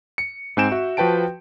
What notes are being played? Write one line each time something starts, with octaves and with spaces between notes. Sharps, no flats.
C#7
G#2 C4 G#5 G6 D7 E7
F#4 E5
F3 F#4 B4 G5 A5 D7